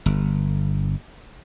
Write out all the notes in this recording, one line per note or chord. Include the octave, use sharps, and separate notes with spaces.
G1